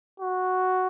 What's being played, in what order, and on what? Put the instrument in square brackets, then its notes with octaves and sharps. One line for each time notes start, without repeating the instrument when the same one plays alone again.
[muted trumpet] F#4